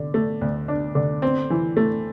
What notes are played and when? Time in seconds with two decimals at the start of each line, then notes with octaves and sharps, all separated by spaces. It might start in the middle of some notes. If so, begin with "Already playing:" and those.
Already playing: D3
0.14 A3
0.41 D2
0.68 D4
0.95 D3
1.22 C4
1.50 E3
1.77 A3